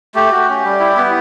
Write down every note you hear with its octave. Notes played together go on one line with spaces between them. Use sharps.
A3 G4
F#4
C#4
G3
E4
B3